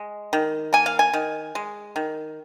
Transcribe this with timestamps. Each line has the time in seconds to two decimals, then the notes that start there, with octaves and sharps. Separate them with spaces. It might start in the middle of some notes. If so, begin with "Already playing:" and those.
Already playing: G#3
0.33 D#3
0.73 A#3 G#5
0.86 F5
0.99 G#5
1.13 D#3
1.55 G#3
1.96 D#3